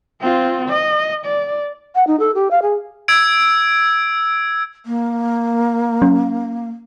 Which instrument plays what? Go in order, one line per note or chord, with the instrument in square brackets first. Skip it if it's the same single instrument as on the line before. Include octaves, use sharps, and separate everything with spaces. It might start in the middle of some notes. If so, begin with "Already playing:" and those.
[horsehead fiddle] C4 F4
D#5
D5
[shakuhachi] F#5
D#4
A4
G4
F5
G#4
[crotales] E6 G#6 D7
[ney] A#3
[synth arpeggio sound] F#3 C#4